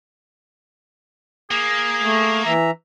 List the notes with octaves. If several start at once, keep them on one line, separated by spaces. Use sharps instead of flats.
A#3 G#4
A3
E3 E5 A#5